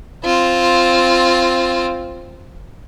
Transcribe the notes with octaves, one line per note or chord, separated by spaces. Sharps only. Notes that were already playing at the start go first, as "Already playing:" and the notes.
C4 F4